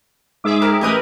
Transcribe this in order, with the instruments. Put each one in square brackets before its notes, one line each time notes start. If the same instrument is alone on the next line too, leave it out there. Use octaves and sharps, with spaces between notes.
[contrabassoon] G#2 [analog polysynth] G#4 E5 D6
[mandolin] C4 A#4 F6
[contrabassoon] A1 [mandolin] E4 D#5 D#6 [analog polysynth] G4 A#4 B4